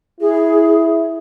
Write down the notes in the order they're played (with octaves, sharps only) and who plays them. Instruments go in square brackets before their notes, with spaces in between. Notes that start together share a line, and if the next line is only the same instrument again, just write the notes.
[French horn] E4 [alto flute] G#4